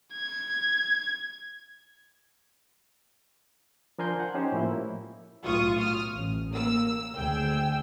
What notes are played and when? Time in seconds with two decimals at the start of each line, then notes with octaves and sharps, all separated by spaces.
0.13 G#6
3.99 F3 D4 A#4 G#5 C6 G6
4.20 F#5
4.35 C#4 D#4 G4 C5
4.52 A2 F3 A#3 E4
5.45 B1 A2 F4 C#6 D#6
5.79 D#6 F6
6.11 A1
6.53 A#3 E6
7.14 D2 G#4 G5 E6